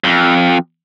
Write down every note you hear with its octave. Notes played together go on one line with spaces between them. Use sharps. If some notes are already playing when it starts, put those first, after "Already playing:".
F2